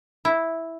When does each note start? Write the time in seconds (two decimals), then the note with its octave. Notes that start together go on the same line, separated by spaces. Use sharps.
0.25 E4